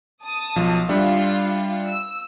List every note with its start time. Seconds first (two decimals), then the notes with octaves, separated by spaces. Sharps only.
0.24 A5 D#6
0.56 B1 F3
0.89 G3 D4 F4 E5
1.88 E6